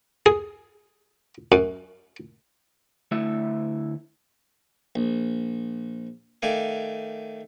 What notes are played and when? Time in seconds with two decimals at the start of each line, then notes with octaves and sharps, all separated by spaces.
0.26 G#4
1.52 F#2
3.11 D2 A3 E4 E5
4.96 A#1
6.42 D#3 A3 D5 F5 G#5